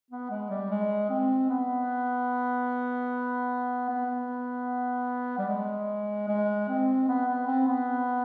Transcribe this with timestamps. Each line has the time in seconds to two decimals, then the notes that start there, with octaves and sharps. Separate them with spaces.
0.11 B3
0.30 G#3
0.50 G3
0.70 G#3
1.10 C4
1.49 B3
3.89 B3
5.39 G3
5.48 G#3
6.28 G#3
6.68 C4
7.08 B3
7.28 B3
7.47 C4
7.68 B3